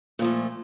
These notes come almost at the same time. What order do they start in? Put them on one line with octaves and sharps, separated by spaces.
A#2 F3 A3